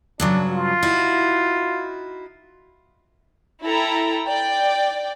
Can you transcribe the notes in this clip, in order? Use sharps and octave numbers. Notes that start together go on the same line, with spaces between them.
G2 C#3 F#3 D4
F4
D#4 E4 F#4
E4 A4 G5 A#5
D5 G5